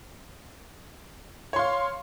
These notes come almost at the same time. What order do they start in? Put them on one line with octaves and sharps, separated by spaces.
C#5 C6 F5